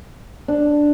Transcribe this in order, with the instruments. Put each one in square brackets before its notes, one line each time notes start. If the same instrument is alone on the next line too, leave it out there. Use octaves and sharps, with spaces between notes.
[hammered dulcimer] D4